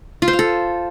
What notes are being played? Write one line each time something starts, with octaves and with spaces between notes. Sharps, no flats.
F4
C5
F5
A4